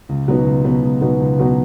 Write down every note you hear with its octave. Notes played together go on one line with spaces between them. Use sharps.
C#2
B2 F#3 B3 D#4
C#2
B2 F#3 B3 D#4
C#2
B2 F#3 B3 D#4
C#2
B2 F#3 B3 D#4